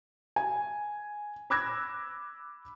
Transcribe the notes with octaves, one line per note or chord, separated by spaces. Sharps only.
G#5
B5 D6 E6 F#6 G#6 A#6